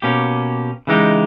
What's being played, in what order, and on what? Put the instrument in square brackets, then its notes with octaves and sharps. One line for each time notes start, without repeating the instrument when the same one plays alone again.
[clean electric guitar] B2 A#3 C#4 G4
C#3 E3 G#3 D#4 G4